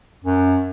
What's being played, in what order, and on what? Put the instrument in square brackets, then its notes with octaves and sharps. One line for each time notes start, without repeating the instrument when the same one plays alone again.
[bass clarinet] F#2